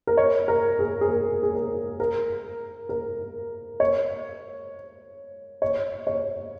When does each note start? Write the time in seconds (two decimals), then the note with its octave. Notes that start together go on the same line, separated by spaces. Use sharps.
0.07 A#4
0.17 C#5
0.48 A#4
0.79 G#4
1.01 G#4
1.09 A#4
1.43 G#4
1.54 A#4
2.00 A#4
2.89 A#4
3.80 C#5
5.62 C#5
6.07 C#5